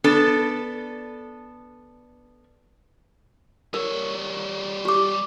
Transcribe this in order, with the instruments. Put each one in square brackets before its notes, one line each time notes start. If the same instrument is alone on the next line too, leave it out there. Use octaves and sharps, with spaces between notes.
[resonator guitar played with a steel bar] B3 D4 A4
[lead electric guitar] G3 C#5 [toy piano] A#4
[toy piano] G4 D6